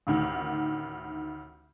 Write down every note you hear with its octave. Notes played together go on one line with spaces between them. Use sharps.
A1 D2 D#3